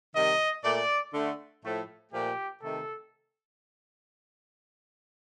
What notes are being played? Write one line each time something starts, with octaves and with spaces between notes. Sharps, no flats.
C3 D#3 G3 D#5
A#2 A3 D5
D3 A3
A2 F3 A3
A#2 F3 A3 G4
C3 D#3 A3 A4